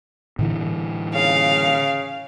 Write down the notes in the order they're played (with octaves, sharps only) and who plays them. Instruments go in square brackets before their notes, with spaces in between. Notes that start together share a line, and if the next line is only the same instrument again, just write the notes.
[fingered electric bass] A2 D3 E3
[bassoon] C#3 [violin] F5